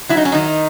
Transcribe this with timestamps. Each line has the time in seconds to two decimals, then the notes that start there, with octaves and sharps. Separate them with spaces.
0.09 F#3 E4
0.17 D#4
0.25 C#4
0.32 D#3 D#4